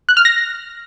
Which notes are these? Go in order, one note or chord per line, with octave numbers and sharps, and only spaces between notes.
F#6
F6
A#6